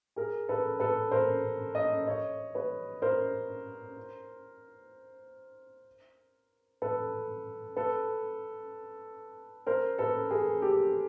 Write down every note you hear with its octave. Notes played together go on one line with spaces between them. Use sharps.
G#4 A#4
A4 B4
A4 B4
A#4 C5
C#5 D#5
C#5 D#5
B4 C#5
A#4 C5
A4 B4
A4 B4
A#4 C5
A4 B4
G#4 A#4
G4 A4